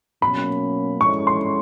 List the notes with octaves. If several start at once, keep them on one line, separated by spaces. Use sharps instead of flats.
B2 F#3 A#3 C#4 B5
G#3 C#4 E4 A4 C#5 C#6
C6